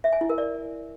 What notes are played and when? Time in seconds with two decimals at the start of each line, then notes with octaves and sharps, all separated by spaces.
0.04 E5
0.13 G#5
0.21 E4
0.30 A#4
0.38 D5